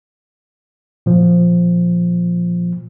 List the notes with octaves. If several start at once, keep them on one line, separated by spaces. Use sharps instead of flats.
A#2 F3